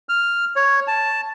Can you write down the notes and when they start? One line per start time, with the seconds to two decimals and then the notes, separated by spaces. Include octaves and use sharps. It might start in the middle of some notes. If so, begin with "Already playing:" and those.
0.09 F6
0.56 C#5
0.87 A5